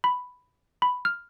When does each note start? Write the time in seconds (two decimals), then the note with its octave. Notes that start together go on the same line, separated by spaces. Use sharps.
0.04 B5
0.82 B5
1.05 F6